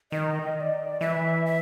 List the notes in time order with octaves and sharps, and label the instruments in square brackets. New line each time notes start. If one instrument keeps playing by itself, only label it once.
[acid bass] D#3 [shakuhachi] D#5
[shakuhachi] D#5
D5
[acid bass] E3 [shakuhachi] E5
[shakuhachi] E5